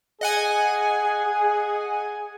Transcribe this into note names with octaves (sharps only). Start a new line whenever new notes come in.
G#4 D#5 F#5 G#5